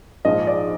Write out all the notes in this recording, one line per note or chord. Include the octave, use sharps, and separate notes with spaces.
A#1 G#2 F3 D#5
D5